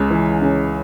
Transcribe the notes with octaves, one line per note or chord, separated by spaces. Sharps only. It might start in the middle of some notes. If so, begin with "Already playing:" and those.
Already playing: C#2 C#3
E3
C#3